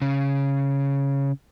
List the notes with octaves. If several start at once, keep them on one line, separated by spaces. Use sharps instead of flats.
C#3